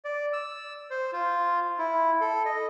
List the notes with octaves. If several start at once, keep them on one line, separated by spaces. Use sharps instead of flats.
D5
E6
C5
F4
E4
A4
D#5